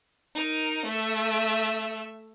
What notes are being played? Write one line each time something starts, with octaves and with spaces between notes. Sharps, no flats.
D#4 A#4
A3 E5